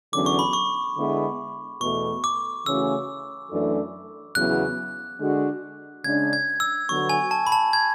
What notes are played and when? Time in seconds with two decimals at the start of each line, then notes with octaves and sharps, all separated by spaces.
0.12 E2 D3 F#3 C#4 D6
0.26 C#6
0.39 B5
0.53 C#6
0.97 D3 G#3 B3 E4 B4
1.81 E2 B2 A3 C#6
2.24 D6
2.66 C#3 E3 A3 C#4 F#4 E6
3.50 F#2 E3 A3 D4 A4
4.35 E2 C#3 F#3 B3 E4 F#6
5.20 D3 G#3 D4 F#4
6.04 C#3 G#3 D4 G#6
6.33 G#6
6.60 E6
6.88 D3 F#3 B3 F#4 C#6
7.09 G#5
7.31 A5
7.47 B5
7.52 A5
7.73 G#6